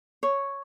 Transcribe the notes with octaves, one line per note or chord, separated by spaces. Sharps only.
C#5